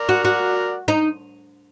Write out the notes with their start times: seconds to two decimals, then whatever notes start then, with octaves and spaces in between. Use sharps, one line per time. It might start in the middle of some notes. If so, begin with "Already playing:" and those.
Already playing: A#4 D5
0.09 F#4
0.25 F#4
0.88 D#4